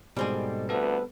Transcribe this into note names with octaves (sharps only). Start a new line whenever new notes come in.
G#2 B2 G3 C4 G#4 A4 D5 D#5
D2 B3 A4 B4